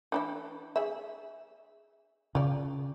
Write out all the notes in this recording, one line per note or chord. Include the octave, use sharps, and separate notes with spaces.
E3 D4 E4
G#4 E5
C#3 F4 D5